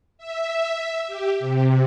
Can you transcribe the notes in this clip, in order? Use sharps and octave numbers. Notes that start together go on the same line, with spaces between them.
E5
G4
C3